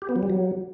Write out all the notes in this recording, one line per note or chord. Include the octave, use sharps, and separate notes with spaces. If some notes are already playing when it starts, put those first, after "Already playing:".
G4
B3
F#3
G3
F#3